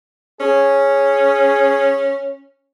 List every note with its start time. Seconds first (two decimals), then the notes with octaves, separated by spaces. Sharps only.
0.41 C#4 G#4